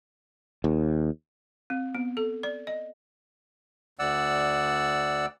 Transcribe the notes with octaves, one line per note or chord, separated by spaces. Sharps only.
D#2
C4
B3
A4
D5
D#5
D2 D5 F#5 E6